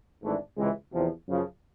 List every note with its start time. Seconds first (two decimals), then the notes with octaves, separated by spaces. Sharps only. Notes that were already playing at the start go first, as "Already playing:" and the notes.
0.21 G#1 G#2 E3 A3 D4
0.56 C#2 C3 E3 G#3
0.93 E2 C3 F3
1.28 F#2 C#3 F3